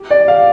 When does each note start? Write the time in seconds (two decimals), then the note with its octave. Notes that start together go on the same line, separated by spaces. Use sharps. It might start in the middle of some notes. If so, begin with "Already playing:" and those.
Already playing: G4
0.10 D5
0.28 F5